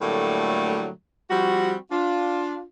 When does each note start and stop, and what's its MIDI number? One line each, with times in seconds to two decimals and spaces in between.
0.02 0.89 45
0.02 0.89 50
0.02 0.89 54
0.02 0.89 55
0.02 0.89 57
0.02 0.89 58
1.30 1.75 53
1.30 1.75 55
1.30 1.75 60
1.30 1.75 66
1.91 2.62 62
1.91 2.62 65